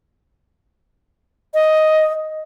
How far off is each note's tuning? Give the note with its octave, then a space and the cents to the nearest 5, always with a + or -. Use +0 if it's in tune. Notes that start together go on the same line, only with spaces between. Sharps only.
D#5 +5